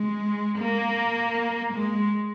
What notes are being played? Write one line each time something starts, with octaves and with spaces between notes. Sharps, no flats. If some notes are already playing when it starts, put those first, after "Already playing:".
Already playing: G#3
A#3
G#3